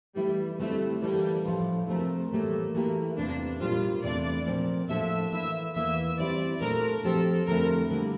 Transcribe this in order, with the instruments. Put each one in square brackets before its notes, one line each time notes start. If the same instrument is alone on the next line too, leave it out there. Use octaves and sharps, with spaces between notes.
[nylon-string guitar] E3 A3 E4 [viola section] G3
[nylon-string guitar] D3 G3 C4 E4 [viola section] A3
[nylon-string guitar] E3 A#3 E4 A4 [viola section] G3
[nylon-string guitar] A2 F3 A3 D4 F4
[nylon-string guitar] C3 F3 C4 G4 A#4 [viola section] A3
[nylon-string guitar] A2 E3 G3 A#3 [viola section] A3
[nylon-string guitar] E3 A3 E4 G4 A#4 [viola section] A#3
[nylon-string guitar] E2 C3 E3 A#3 [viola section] D4
[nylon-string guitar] A#2 G3 D4 G4 C5 [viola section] F4
[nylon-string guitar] E2 C3 E3 A3 D4 [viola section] D5
[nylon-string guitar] A#2 F3 C4
[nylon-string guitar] A2 F3 A#3 D4 A4 [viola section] E5
[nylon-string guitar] E3 A#3 E4 [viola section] E5
[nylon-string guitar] E2 E3 A#3 [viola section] E5
[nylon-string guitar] E3 G3 C4 E4 G4 [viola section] D5
[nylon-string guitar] A#2 A3 D4 A4 C5 [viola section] A#4
[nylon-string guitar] F3 C4 G4 C5 [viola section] A4
[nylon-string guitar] F2 D3 A3 C4 E4 [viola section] A#4
[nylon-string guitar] D3 G3 A#3